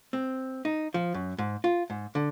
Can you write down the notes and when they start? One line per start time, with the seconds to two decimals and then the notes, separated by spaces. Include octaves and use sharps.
0.13 C4
0.65 D#4
0.94 F3
1.14 F#2
1.38 G#2
1.64 F4
1.90 G#2
2.15 D3